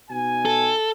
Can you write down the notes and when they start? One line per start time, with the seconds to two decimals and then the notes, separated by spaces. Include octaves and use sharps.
0.11 B2 D#4 G#5
0.46 A4